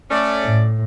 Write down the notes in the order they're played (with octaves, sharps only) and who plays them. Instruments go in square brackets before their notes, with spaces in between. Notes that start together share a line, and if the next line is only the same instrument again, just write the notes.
[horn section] A3 C#4 D5
[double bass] A2